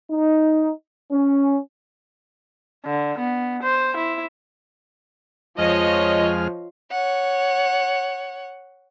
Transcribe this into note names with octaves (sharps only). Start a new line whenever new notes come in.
D#4
C#4
D3
B3
C5
E4
F2 F3 G#3 C#5 D#5 F6
C#5 F#5